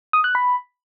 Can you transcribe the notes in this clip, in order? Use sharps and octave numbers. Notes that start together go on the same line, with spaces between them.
D#6
F#6
B5